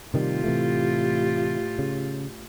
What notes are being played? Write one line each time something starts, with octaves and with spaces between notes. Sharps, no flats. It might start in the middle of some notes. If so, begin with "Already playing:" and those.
A2 C3 D#3 G3 F4 G4
C3 E3 A3
C#3